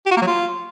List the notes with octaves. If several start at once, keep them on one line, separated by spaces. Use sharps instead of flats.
G4
F#4
A#3
F#3
F4